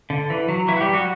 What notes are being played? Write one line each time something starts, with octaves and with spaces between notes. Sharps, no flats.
D3
E3
F#3
E3 E4
F#4
G3 G4
F#3 F#4